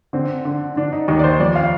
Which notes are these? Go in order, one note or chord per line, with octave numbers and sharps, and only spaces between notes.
D3 C4
D3
D3 D4
D#4
D#2 D#4
D5
C5
F2 D5
F5